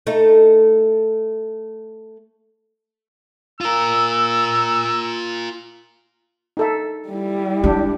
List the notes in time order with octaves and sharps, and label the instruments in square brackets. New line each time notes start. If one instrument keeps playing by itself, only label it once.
[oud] A3 D#4
[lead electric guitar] F4 A#4 [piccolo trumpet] E6
[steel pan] D#4 A4 E5
[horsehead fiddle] G3 E4
[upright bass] G#3 [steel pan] D4 G4